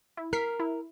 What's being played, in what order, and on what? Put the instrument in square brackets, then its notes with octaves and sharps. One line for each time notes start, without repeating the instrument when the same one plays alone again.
[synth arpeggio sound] E4
[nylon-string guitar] A#4 [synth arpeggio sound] F6 B6 C7
[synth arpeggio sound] E4